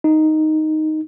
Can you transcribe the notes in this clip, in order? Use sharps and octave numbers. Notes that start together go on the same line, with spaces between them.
D#4